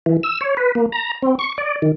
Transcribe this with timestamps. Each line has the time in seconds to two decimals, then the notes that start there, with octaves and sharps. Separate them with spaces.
0.06 E3
0.23 E6
0.41 C#5
0.57 B4
0.75 A#3
0.92 A#5
1.22 C4
1.39 C#6
1.58 D5
1.82 D#3